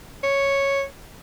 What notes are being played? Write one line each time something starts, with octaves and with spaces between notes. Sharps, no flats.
C#5